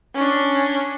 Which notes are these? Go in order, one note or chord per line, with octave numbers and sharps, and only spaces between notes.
C#4 D4